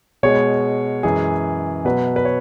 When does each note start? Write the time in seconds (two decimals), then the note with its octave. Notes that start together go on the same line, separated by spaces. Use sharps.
0.23 B2 G#3 C#5
1.03 F#2 E3 G#3 G#4
1.85 B2 F#3 B4
2.16 B4
2.25 C#5